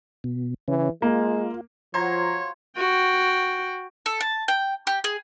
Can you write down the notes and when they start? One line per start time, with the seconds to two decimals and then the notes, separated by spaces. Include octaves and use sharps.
0.24 B2
0.68 C#3 E3 C#4
1.02 G#3 A#3 F4
1.94 F3 F#3 F4 C5 C#5 A#5 C6 G#6
2.77 F#4 G5
4.06 A4
4.20 A5
4.48 G5
4.87 G4
5.04 G#4